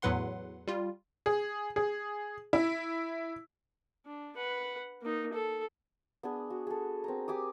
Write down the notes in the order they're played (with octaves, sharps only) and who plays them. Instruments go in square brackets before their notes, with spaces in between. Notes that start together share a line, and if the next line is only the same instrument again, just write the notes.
[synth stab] E2 A2 F#3 B4 F#5 C6
G3 F4
[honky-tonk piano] G#4
G#4
E4
[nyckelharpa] D4
B4 F#5
A#3 D#4
A4
[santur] B3 D4 G#4
F#4
G#4 A4
C4 A#4 A#5
G4 G#5 D6 D#6